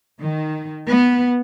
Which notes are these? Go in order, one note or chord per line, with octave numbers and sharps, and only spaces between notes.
D#3
B3